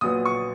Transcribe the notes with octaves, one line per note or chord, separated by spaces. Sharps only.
A#1 A#2 F#3 B3 D#6
C#6